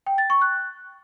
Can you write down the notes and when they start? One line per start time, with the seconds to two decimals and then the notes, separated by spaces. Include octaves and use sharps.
0.07 G5
0.18 A6
0.30 C#6
0.41 F#6